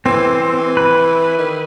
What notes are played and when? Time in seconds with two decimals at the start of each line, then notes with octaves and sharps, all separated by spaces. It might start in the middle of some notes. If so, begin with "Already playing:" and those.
0.06 E3 C4
0.77 B4
1.38 D#3